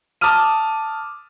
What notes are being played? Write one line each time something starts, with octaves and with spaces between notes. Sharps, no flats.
A5 D6 D#6 F6 D#7